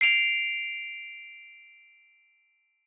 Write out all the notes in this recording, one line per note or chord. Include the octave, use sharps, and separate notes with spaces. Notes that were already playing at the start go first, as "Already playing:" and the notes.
C7 D7 F7